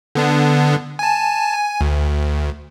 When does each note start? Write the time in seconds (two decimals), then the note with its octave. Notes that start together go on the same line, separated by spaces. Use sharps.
0.15 D3 B3 D4
0.99 G#5 A5
1.54 G#5
1.81 D2